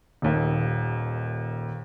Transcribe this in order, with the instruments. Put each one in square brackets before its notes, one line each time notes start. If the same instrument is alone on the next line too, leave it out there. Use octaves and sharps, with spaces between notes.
[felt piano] D#1 D#2